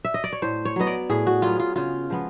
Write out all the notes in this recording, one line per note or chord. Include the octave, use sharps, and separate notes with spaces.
E5
D#5
D5
C#5
A2 C5
C#5
F#3 B3 D#5
D5
A2 G#4
F#4
F#3 B3 F4
F4
C#3 F4
F3 G#3 B3